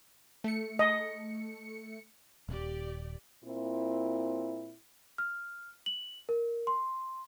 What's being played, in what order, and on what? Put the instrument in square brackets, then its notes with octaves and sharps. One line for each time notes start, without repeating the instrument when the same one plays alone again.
[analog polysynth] A3 C#7
[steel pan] D#5
[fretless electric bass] D#1 [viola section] G4 D5
[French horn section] A#2 C4 E4
[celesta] F6
F#7
A#4
C6